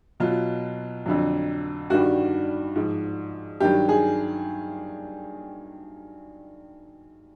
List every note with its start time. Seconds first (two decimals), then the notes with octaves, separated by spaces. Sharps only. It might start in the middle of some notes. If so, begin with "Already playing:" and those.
0.20 B2 F#3 F4
1.06 F2 D3 F#3
1.90 G2 D#3 G3 F#4
2.75 G#2 F3
3.60 G2 D#3 F#3 G4
3.89 G#4